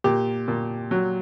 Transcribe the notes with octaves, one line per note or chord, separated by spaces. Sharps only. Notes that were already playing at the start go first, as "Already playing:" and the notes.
A#2 G4
A#2
F#3